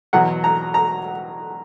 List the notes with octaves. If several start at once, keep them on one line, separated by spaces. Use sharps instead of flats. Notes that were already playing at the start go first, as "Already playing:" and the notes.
E2 B2 F#3 F#5
A#5
A#5